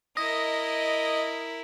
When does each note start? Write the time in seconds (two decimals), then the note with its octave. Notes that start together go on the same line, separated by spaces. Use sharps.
0.17 E4 A#4 D#5